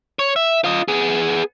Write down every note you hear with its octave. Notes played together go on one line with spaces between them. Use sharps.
C#5
E5
F4 D#5
B3 G#4